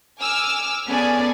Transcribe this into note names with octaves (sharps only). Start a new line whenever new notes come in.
G#5 D6 E6 F6
B3 C#4 G#4 A4 D5 G#5